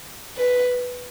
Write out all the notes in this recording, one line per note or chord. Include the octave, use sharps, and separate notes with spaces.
B4